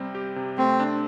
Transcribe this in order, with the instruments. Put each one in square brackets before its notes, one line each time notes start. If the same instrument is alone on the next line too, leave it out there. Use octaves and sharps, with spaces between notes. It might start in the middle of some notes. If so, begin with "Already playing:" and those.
Already playing: [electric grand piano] C3 G3 C4
G4
C3
[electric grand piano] A3 [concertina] C4
[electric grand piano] D4